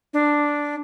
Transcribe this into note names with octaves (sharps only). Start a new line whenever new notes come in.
D4